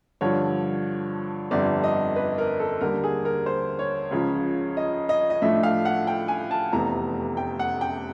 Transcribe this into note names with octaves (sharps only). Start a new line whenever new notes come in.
G2 D3 F3 C#5
G1 F2 D3 G3 D5
D#5
B4
A#4
A4
D#2 D3 G3 A#4
G#4
A#4
C5
C#5
C#2 C#3 F3
D#5
D#5
D#5
A2 F3 A3 D4 E5
F5
F#5
G5
G#5
A5
F1 E2 C3 E3 A3 A#5
G5
F#5
G5